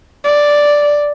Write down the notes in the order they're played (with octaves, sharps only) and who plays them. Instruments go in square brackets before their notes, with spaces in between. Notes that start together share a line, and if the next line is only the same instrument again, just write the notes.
[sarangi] D5